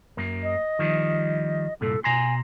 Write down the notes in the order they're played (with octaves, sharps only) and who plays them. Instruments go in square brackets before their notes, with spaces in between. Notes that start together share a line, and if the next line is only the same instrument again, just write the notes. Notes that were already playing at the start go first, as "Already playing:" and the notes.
[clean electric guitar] F#2 A#3
[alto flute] D#5
[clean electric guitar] D#3 F3 G3
[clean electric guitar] C2 G2 A#2 [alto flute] A4
[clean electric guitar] B2 A#5 C6 [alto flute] G#5